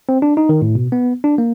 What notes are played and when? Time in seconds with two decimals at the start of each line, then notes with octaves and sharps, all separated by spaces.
0.09 C4
0.22 D4
0.37 D#4
0.49 D#3
0.62 A2
0.75 B2
0.92 B3
1.24 D4
1.38 A#3